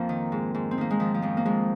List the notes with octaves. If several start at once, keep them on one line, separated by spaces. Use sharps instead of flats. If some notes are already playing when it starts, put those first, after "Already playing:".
Already playing: F2 F3 A#3 C4
D#3
G#2
G#2
C4
D#3 A#3
G#3
D#3 F3
F3
F2 G#3
A#3
F2 G#3